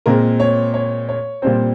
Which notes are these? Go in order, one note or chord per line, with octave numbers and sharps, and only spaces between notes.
A#2 G#3 C4 A#4
C#5
C#5
C#5
A#2 G3 C4 C5